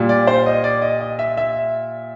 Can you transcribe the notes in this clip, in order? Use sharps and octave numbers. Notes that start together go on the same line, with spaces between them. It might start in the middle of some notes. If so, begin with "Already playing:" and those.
Already playing: A#2 G3
D5
C5
D#5
D5
D#5
D#5
E5
E5